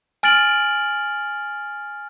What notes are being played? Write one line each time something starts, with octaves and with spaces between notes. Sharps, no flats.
G#5 F6 A6 D7 F#7